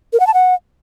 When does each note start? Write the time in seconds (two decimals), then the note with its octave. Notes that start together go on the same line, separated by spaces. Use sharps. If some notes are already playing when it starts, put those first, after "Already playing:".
0.13 A#4
0.20 F#5
0.27 A5
0.34 F#5